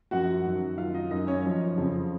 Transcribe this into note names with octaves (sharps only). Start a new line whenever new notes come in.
F#2 F3 F#4 F#5
F#2 D#3 F#3
F#2 D#3 F#3 F4 F5
D#4 D#5
F#2 D#3 F#3 D#4 D#5
C#4 C#5
F#2 F3
F2 C#3 F3